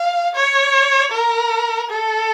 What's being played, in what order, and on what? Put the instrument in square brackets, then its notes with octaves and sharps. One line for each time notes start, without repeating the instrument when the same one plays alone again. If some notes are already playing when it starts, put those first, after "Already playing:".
Already playing: [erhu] F5
C#5
A#4
A4